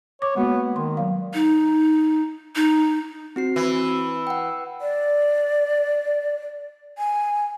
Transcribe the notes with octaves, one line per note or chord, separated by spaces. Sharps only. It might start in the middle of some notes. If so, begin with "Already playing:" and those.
C#5 D6
G#3 A#3 B3 F#4
D#3 C6
F#3 F5
D#4
D#4
C4 F#4 C7
E3
F#5 G5
D5
G#5